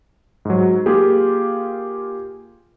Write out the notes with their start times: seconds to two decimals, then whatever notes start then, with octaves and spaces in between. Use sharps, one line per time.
0.45 G#2 F#3
0.86 A#3 F4 G4 G#4